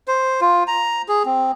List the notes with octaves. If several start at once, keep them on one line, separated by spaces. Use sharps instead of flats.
C5
F4
A#5
G#4
C4